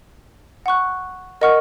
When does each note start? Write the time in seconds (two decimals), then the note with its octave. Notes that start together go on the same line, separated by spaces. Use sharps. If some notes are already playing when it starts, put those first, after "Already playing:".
0.66 F#5 C#6 F#6
1.41 A#4 D#5 F#5 C#6 F6